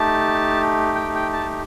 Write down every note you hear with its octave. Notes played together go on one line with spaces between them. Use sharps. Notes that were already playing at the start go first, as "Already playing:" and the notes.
Already playing: A3 D#4 G4 A5
G5
G5
A5